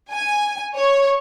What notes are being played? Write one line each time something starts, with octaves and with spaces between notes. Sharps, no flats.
G#5
C#5